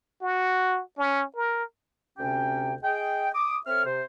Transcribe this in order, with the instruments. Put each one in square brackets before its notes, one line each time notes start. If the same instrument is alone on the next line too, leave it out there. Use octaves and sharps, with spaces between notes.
[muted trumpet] F#4
C#4
A#4
[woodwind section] D2 C3 C4 C#4 G5
G#4 D#5 G5
D6 D#6
C4 A4 C#5 E5 F6
C3 C5